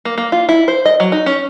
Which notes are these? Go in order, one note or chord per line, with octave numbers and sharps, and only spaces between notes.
A#3
A#3
F4
E4
C5
D#5
F#3
D#4
C#4